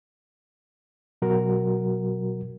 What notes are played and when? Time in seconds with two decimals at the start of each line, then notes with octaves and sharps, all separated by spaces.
1.22 B2 F#3 F#4 A#4